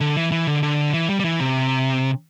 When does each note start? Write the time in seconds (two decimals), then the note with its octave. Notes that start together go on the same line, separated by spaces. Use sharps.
0.01 D3
0.17 E3
0.32 E3
0.47 D3
0.63 D3
0.93 E3
1.10 G3
1.20 G3
1.24 E3
1.40 C3